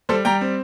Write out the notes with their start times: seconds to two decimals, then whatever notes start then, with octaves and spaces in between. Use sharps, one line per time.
0.09 G3 A4 C5
0.25 G3 G5 A#5
0.41 C4